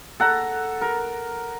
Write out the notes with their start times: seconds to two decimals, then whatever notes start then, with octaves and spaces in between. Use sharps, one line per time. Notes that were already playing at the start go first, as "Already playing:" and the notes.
0.20 A4 F#5 A#5
0.81 A#4